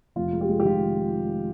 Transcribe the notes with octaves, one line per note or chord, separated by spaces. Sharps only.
F1 F4
G#3
G4
G#3
G4
D#3 F4